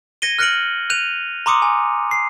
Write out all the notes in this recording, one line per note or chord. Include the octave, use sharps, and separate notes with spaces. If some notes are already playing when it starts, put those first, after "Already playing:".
G#6 A#6 C#7 D#7 G7
F6 F#6 A#6 C#7 D7 F#7
F#6 G6 D#7 F7
A#5 C6 D6 D#6 C#7
G#5
C7